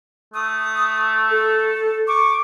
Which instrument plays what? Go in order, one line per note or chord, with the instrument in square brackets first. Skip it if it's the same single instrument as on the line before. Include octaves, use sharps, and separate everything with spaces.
[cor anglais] A3 [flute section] D#6
[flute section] A4
C#6 D6